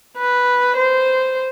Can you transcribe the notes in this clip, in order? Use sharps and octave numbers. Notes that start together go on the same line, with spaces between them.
B4
C5